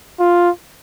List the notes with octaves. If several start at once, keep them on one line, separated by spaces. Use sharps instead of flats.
F4